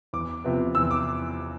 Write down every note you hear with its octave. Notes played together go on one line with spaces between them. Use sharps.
E2 D6
C3 F3 B3
E2 E6
D6